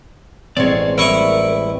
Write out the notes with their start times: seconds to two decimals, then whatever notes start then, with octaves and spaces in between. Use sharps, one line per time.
0.57 A1 G#3 C4 C#5 D5
0.98 G3 E4 A#4 C#6 D#6